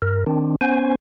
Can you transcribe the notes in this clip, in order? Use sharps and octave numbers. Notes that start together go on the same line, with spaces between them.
G2 A#4
D#3 C4 D4
B3 C#4 C5 G#5